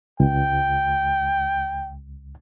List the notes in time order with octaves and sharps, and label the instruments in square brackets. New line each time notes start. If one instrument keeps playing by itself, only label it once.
[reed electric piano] C#2 [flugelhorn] G5